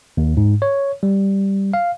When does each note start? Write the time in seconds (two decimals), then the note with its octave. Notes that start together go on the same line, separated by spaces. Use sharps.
0.17 D#2
0.37 G#2
0.62 C#5
1.03 G3
1.73 F5